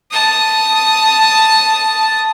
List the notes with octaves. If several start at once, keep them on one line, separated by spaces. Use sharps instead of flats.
A5 D#6